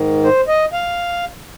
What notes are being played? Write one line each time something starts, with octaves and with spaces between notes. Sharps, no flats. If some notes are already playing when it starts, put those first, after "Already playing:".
Already playing: G#2 D#3
C5
D#5
F5